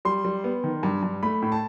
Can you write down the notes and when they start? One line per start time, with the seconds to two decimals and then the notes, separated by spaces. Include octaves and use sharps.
0.05 G3 C6
0.25 G3
0.44 B3
0.64 D#3
0.83 G2
1.03 G2
1.23 A3 B5
1.42 A2
1.52 A5